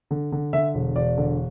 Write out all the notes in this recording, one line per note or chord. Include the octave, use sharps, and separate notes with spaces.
D3
D3
D3 E5
E1
E1 D5
D3